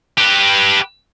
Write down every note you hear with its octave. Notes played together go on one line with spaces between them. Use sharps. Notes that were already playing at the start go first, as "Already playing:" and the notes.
G4 B4